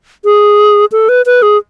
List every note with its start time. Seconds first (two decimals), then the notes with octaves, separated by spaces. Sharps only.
0.25 G#4
0.92 A4
1.09 B4
1.26 B4
1.42 G#4